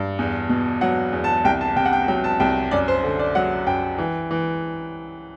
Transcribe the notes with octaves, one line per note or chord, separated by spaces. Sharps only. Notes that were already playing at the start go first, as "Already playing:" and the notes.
Already playing: G2
E2
B2
F#3 F#5
E2
A5
C2 G5
A5
C3 G5
F#5
G5
F#3 G5
A5
C2 G5
F#2 D5
C5
D3
D5
F#3 F#5
F#2 G5
E3
E3